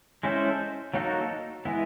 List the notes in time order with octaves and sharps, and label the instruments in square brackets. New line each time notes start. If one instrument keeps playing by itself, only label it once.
[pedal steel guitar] G#3 C#4 E4 A4 C5
F#3 A#3 D#4 F#4 A4
E3 G#3 B3 E4